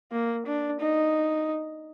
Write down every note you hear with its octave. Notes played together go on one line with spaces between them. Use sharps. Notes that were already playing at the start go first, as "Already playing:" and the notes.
A#3
D4
D#4